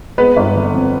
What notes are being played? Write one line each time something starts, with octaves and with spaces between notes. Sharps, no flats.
G#3 B3 B4
G1
D3
F2